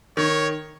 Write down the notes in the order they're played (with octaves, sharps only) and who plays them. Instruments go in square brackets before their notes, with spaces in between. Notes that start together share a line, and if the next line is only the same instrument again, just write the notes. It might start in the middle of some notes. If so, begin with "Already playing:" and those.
[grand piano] D#3 [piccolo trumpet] C#5